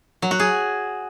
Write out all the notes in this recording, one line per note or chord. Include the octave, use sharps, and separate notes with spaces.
F#3
F#4
G#4